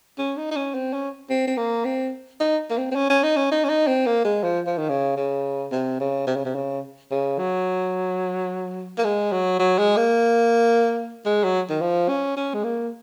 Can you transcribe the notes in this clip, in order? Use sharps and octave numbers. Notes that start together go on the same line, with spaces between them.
C#4
D#4
D#4
C#4
C4
C#4
C4
C4
A#3
C4
D#4
A#3
C4
C4
C#4
C#4
D#4
C#4
D#4
C#4
D#4
C4
A#3
G#3
F3
F3
D#3
C#3
C#3
C3
C#3
C3
C#3
C3
C#3
C#3
F#3
A#3
G#3
F#3
F#3
G#3
A#3
G#3
F#3
D#3
F3
C#4
C#4
G#3
A#3